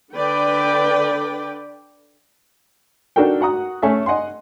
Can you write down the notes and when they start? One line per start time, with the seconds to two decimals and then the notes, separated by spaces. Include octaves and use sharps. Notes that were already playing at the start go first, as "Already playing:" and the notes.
0.15 D3 B4 D5 G5
3.16 D4 D#4 F#4 A4 A#4 G5
3.41 F#4 F#5 A#5 D#6
3.82 A3 C#4 A4 E5 G#5
4.06 D#5 F#5 G#5 C6